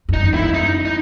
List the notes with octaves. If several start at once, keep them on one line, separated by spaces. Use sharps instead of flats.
F#2
D#4
E2
F#2 E4
D#4
D#4